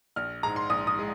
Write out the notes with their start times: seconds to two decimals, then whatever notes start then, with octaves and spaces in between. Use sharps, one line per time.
0.16 A#1 F6
0.43 G#2 G#3 A#5
0.56 C6
0.70 A#1 D#6
0.87 D#6
0.99 G#3